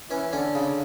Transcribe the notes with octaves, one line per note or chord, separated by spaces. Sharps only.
E3 C#4
D3 C#4
C#3